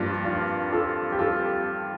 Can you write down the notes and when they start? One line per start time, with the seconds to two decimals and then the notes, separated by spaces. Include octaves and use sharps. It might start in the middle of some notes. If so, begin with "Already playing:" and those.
Already playing: G2 F3 A#3 D4 F4
0.25 D4 F4
0.72 F4 A4
1.12 G4
1.19 F4 A4